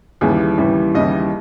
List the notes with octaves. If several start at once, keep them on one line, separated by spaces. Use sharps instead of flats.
D#2 C#3 E3 G3 G#4
D#2 C#3 E3 G3
D#2 C#3 E3 G3 D#5